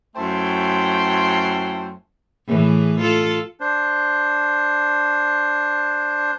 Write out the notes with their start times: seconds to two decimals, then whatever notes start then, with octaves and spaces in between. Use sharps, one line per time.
0.16 F#2 A3 E4 C5 G5 C6
2.46 A2 E3 G#4
3.00 F4 A4
3.60 D4 C5